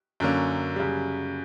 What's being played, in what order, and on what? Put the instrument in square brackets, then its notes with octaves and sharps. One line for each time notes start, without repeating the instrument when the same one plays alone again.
[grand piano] F#2 D3 A#3 C#4
F#2 C#3 G3